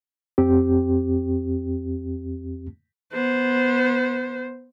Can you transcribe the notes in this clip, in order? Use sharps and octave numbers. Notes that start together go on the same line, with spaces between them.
F2 C4 G4
B3 C5